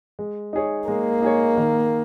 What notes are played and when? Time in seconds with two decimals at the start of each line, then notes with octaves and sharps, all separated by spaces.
0.19 G#3
0.53 D#4 G#4 C#5
0.88 G#3 A#3
1.22 D#4 G#4 C#5
1.57 D#3